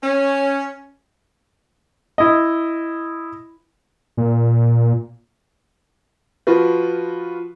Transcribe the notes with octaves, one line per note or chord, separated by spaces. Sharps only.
C#4
E4 D#5
A#2
F3 F4 F#4 B4